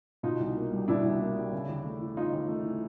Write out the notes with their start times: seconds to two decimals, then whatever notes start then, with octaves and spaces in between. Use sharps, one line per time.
0.23 B2 D#4 F4
0.40 C2
0.56 A#3
0.72 G3
0.88 B2 D4 E4
1.04 C2
1.20 A#3
1.37 G3
1.52 C#3
1.69 D#2
1.84 A3
2.01 E3
2.16 C#3 D#4 F4
2.33 D#2
2.48 A3
2.65 E3